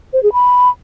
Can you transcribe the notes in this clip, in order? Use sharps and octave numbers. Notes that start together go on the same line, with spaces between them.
C5
G#4
B5